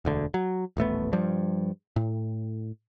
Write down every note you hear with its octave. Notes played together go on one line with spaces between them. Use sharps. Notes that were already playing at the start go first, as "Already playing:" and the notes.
E1 D2 D3
F#3
D#1 A1 A3 B3
G2 F3 G3
A2